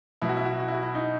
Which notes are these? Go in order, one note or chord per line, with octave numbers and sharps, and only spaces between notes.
B2 F#3 E4
F#4
E4
F#4
E4
F#4
E4
F#4
E4
D#4